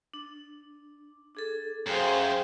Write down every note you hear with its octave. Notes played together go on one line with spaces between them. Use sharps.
D4
D4 G#4 A4
F#2 G#4 C5 F5 G5